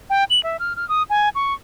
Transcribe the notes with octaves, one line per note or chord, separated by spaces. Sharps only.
G5
F#7
E5
F6
F6
D#6
G#5
C#6